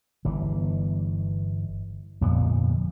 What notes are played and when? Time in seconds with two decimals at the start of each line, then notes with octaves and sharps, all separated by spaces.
0.25 G1 E3
2.21 G1 F2 A#2 B3